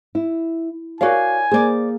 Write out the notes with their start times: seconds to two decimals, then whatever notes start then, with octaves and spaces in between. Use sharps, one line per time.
0.15 E4
1.01 F#4 A#4 C#5 D5 F5 G#5
1.51 A#3 G#4 C5 D5